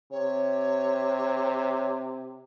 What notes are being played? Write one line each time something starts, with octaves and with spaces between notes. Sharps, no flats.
C3 C#5